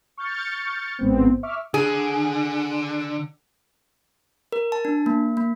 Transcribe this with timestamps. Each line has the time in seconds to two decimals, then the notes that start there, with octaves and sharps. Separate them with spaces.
0.17 C#6 F6 G6 A6 C#7
0.99 A1 G#2 B3 C4
1.43 E5 C#6 D6 F6
1.74 D3 G#4
4.52 A#4
4.72 A5
4.85 D4
5.06 A#3
5.37 A#3